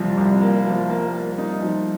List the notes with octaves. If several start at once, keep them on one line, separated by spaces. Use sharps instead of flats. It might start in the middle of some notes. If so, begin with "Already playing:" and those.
Already playing: C2 C3 F3
C2
A#3
F3
A#3
A#3
D#4
F3